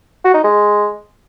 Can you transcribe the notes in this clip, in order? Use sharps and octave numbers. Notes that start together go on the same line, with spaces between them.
F#4
D#4
G#3